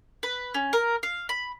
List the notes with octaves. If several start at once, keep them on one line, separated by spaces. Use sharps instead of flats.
B4
C#4
A#4
F5
B5